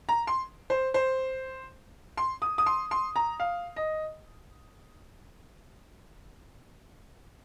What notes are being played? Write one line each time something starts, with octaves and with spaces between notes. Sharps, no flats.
A#5
C6
C5
C5
C6
D#6
D#6
C6
C6
A#5
F5
D#5